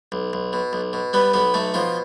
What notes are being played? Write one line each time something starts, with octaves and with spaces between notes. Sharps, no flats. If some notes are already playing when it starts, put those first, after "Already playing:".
B1
B1
B2
B1
B2
G3 B3 B4
B1 B3 B4
B1 A3 A4
B2 F3 F4